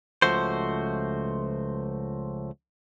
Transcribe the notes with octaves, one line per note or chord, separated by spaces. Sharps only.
C#2 F3 A3 F#4 C5